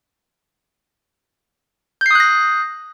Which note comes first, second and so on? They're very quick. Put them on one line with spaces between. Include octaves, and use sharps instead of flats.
G6 C7 D#6 F#6 A#6